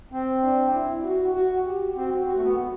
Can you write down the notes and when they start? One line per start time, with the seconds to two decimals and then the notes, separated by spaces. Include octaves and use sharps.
0.12 C4
0.43 D4
0.73 E4
1.04 F#4
1.34 F#4
1.65 G4
1.96 C4 F#4
2.27 F#4
2.35 A3
2.42 B3